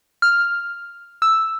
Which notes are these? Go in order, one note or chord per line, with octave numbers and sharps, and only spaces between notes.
F6
E6